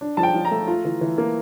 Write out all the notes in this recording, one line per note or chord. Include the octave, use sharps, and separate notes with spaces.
D4
F3 A5
G5
F3
A#5
A3
F4
E3
E3
A#3